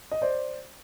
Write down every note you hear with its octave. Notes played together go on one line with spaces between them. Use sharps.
D#5
C5 D5